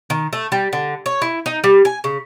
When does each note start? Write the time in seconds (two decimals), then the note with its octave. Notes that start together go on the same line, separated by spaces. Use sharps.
0.10 D#3
0.33 A3
0.52 G3
0.73 D3
1.06 C#5
1.22 E4
1.46 D#4
1.64 G3
1.85 G#5
2.04 C#3